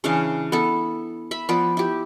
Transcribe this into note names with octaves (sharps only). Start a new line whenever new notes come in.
C#3 E3 D4 F5
B3 E4 A4
E5 B5
F3 B3 B4 D5
E4 G4